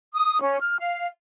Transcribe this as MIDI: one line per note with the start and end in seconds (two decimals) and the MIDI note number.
0.14 0.41 87
0.42 0.59 61
0.60 0.77 89
0.80 1.07 77